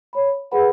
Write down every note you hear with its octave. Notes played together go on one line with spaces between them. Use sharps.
C#5 B5
G#4 B4 F#5 B5